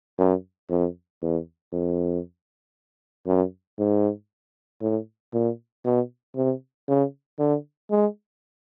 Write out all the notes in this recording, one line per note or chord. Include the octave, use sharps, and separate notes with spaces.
F#2
F2
E2
F2
F#2
G#2
A2
A#2
B2
C3
C#3
D3
G#3